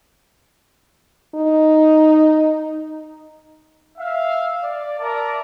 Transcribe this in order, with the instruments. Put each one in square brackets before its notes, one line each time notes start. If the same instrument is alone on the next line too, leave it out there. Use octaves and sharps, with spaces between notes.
[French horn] D#4
[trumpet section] E5 F5
D5
A#4 D5 E5 A5 A#5